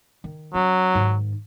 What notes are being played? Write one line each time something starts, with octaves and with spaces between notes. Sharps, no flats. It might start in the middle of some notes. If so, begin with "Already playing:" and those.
D#3
F#3 C#4
G#2 D#3